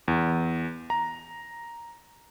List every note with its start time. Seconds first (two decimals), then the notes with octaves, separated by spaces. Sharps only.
0.08 E2
0.90 A#5